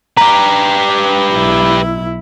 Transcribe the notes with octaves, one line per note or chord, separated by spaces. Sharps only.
G4 B4 A#5
B1 E4